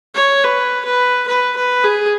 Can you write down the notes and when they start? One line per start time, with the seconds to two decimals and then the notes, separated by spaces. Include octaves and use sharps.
0.15 C#5
0.44 B4
0.85 B4
1.27 B4
1.56 B4
1.84 G#4